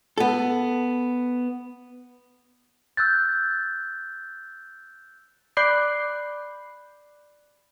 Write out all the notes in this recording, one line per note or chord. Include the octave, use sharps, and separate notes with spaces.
B3 A4
E6 F#6 G6 A6
D5 B5 D6 F#6 G6 C7